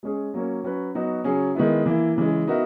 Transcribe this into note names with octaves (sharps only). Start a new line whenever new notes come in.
G#3 C#4 G#4
F#3 A#3 C#4
F#3 C#4 F#4 B4
F#3 B3 D#4 F#4
C#3 F#3 C#4 G#4
D#3 G#3 B3 E4
E3 A#3 E4
C#3 E3 G#3
B3 D#4 F#4 A#4 E5